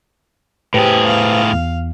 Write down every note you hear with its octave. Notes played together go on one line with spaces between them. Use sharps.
A2 G4 G#4 B4 C5
F5
E2